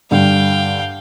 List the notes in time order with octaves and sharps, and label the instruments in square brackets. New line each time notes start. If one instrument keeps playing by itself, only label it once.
[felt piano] G2 D3 [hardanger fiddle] F5 G5